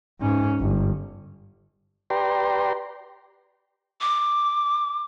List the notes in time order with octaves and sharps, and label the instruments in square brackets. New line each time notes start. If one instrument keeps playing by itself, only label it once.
[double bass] G#2 C#4
G1
[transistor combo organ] G4 B4 D5 G5 A#5 C6
[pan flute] D6